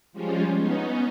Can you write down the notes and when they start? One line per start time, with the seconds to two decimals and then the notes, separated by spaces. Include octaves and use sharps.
0.13 F3 G3 G#3 C#4 F4
0.56 B3 C#4 D#4